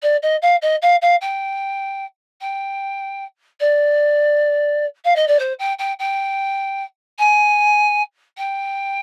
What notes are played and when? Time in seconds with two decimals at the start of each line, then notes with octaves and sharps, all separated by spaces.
0.02 D5
0.22 D#5
0.42 F5
0.62 D#5
0.82 F5
1.02 F5
1.21 G5
2.41 G5
3.60 D5
5.05 F5
5.16 D#5
5.28 D5
5.39 C5
5.59 G5
5.79 G5
5.99 G5
7.19 G#5
8.38 G5